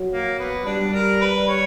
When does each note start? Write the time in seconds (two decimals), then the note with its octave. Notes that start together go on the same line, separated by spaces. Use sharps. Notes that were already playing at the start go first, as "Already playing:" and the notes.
Already playing: F#3
0.11 A#3
0.38 B3
0.65 G3 D4
0.93 A#4
1.21 B4
1.48 C#5